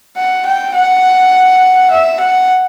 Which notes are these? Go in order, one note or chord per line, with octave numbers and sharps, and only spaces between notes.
F#5
G5
F#5
E5
F#5